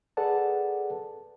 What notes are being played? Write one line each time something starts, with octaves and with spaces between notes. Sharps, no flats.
G#4 A4 B4 D5 F#5 A5